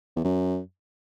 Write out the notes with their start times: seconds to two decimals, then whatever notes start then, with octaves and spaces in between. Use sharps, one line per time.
0.16 E2
0.24 F#2